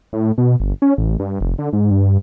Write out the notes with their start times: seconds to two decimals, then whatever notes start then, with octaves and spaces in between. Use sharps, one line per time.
0.13 A2
0.38 B2
0.60 G1
0.82 C#4
0.98 A1
1.19 G2
1.41 F1
1.58 D3
1.73 G#2
1.91 G2